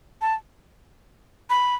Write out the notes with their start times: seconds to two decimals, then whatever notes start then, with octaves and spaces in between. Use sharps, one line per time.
0.21 A5
1.50 B5